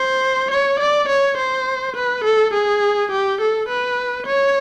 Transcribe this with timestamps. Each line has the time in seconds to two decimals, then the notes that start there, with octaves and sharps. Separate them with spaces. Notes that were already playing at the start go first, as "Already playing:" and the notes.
Already playing: C5
0.50 C#5
0.80 D5
1.08 C#5
1.37 C5
1.96 B4
2.24 A4
2.54 G#4
3.11 G4
3.41 A4
3.68 B4
4.26 C#5